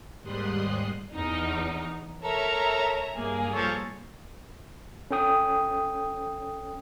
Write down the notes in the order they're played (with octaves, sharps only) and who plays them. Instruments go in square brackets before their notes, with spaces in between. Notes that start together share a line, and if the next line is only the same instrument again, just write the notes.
[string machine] D#2 G#2 G3 C6 D#6 F#6
[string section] E2 D#4
[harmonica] A4 A#4 [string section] C#5 E5 A#5
[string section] G2 A#3 G#4
[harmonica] F3 A4 C#5
[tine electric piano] C#4 A4 G5 D#6